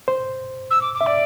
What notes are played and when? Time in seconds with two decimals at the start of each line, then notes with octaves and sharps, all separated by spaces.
0.08 C5
0.70 E6
0.81 D6
0.94 D6
1.01 E5
1.06 D5